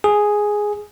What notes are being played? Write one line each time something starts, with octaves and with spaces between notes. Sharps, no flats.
G#4